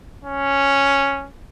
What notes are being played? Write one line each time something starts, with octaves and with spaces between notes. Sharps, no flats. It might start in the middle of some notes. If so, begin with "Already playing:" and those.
C#4